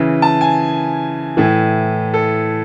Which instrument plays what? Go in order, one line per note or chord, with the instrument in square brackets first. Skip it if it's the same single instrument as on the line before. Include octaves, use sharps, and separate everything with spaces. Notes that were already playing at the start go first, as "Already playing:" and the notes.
Already playing: [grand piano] C#3 E3
A5
G#5
A2 E3
A4